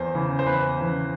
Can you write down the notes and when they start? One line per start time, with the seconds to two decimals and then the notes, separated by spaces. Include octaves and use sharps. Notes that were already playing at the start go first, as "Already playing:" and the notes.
Already playing: E2 C5
0.15 C#3 E3
0.39 C5
0.46 E2 B4
0.78 C#3 E3